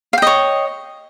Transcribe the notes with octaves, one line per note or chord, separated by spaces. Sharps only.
C#5 D#5 F5 G5